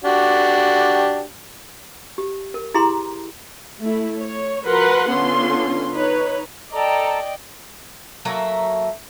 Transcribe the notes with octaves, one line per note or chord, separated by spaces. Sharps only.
D4 F#4 G4
G4
A#4
E4 G4 G#4 A#5 C6
A3 E4
C#5
F3 F#4 A#4 B4 F#5 C6
D3 B3 C#4 F4 C6
D#4 B4 C#5
A4 D5 D#5 G5 A#5
F#3 A3 A#3 E5